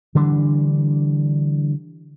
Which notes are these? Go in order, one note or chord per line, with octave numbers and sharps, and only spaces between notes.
D3 E3 G3 D4